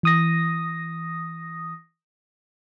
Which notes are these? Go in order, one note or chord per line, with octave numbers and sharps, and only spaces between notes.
E3 D#6 A#6